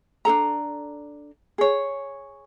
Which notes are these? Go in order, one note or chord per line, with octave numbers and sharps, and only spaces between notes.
D4 D#4 A4 A#5
G#4 C#5